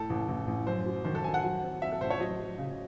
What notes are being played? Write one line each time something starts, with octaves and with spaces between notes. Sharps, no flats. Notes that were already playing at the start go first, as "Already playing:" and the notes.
Already playing: A2 A4
A1
A1
A1
F#2 C5
F#3
D#3 C5
A4
D#3 G#5
F#5
F#3
C4
C4 E5
A4
A1 C5
C#5
F#3 D#5
F#3
C#3